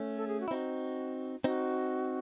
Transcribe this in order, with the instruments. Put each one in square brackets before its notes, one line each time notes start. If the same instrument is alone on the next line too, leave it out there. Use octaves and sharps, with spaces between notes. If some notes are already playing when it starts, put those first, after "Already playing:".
Already playing: [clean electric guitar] A3 C#4
[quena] A4
G#4
F#4
[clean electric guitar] E4
[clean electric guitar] C4 D#4 [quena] F#4
[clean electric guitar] C4 D#4 [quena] F#4